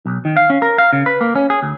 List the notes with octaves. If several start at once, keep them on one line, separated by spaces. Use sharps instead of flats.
B1
D#3
F5
C#4
A#4
F5
C#3
B4
A#3
C#4
G#4
D2